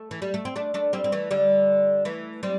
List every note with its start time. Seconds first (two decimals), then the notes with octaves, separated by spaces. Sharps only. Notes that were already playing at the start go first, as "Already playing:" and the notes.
Already playing: A3
0.11 E3
0.22 G3
0.34 A3
0.45 C4
0.56 A3 D4
0.74 A3 D4
0.93 G3 C4
1.04 C4
1.12 E3 A3
1.31 D3 G3
2.05 E3 A3
2.43 G3 C4